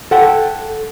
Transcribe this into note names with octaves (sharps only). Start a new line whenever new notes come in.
A4 F#5 G5